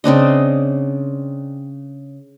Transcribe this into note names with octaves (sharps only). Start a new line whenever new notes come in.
C#3 C4 D4 D#5